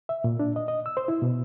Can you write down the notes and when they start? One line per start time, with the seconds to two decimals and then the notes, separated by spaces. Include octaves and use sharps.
0.09 E5
0.24 A#2
0.39 D4
0.56 D#5
0.68 D#5
0.86 E6
0.97 C5
1.08 E4
1.22 B2